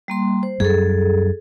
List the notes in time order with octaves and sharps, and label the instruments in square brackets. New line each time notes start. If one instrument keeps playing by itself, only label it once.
[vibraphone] G3 A#3 C6
C5
[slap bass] F#2 G3 [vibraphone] G#4 A4